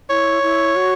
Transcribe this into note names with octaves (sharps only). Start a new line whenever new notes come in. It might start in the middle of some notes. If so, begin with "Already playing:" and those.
E4 C#5
E4
F#4